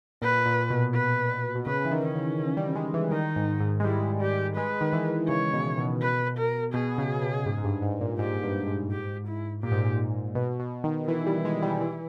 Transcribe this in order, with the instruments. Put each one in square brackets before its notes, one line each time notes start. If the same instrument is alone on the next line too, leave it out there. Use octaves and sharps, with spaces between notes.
[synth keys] A#2 [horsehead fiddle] B4
[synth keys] A#2
B2
[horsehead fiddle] B4
[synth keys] B2
[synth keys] C#3 [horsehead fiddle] B4
[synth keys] E3
D#3
[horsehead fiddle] C#4
[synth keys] C#3
C#3
G3
G#3
E3
[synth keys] D#3 [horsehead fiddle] D#4
[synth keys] G#2
G#2
G#3
[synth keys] G3 [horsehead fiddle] E4
[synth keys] G3 [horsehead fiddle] G4
[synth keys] G#3 [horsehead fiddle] B4
[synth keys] D#3
E3
[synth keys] C#3 [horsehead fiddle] C#5
[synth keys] B2
B2
[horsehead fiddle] B4
A#4
[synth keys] B2 [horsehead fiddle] G#4
[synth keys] C#3
B2
G#2
G#2
G2
G#2
A#2
[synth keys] G#2 [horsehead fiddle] G4
[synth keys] G2
G#2
[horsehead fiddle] G4
E4
[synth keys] A#2 [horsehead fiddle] G4
[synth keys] G#2
A#2
B2
B2
D#3
[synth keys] E3 [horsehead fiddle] E4
[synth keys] G3
G#3
G3
E3